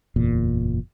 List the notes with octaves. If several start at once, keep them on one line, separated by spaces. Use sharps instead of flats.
F#1 E2 A#2